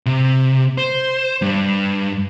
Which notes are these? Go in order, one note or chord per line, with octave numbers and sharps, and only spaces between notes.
C3
C5
G2